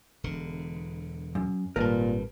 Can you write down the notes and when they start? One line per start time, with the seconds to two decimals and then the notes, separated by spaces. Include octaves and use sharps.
0.24 E1 D3
1.35 F#2
1.76 G#1 A#2 G3 A#4 B4 A5